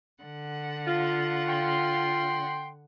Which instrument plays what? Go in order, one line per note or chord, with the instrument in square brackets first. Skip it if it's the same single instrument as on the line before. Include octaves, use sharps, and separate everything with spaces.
[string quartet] D3 F#5
[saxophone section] F4
[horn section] G5 C6